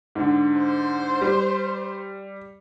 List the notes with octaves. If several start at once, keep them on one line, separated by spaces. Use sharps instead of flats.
G#2 D3
C5
G3